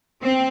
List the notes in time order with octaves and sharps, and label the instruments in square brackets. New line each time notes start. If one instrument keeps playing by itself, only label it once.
[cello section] C4